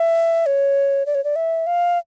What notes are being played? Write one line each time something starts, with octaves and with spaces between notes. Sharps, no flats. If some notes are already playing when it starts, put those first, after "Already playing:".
Already playing: E5
C#5
D5
C#5
D5
E5
F5